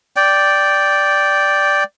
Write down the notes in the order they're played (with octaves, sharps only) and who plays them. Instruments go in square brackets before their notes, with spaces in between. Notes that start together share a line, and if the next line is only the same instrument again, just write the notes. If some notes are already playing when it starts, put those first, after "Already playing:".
[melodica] D5 G5